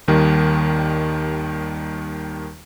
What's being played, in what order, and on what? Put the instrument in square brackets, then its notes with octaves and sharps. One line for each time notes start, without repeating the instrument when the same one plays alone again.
[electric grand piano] D#2 D#3 G3